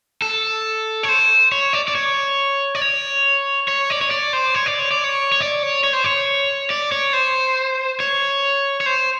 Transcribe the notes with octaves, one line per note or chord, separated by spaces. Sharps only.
A4
C#5
C5
C#5
D5
D5
C#5
D5
C#5
C#5
D5
C#5
D5
C5
C#5
D5
C#5
D5
C#5
C#5
D5
C#5
C#5
C5
C#5
D5
C#5
C5
C#5
C#5
C5